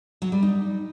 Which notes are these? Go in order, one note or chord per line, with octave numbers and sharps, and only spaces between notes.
F#3
G3
D#4